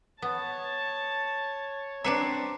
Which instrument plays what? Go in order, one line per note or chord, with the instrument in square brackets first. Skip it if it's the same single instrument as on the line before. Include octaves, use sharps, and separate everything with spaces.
[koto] B3 [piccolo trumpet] C#5 [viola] A5
[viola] C4 [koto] D4 B4 E5 [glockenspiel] A#5 C7 C#7